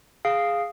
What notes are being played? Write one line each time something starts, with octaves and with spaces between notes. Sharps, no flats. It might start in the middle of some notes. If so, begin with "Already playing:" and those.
G#4 F5